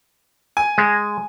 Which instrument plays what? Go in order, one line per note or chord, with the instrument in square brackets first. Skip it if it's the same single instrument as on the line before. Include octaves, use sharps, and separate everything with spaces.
[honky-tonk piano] G#5
[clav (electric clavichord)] G#3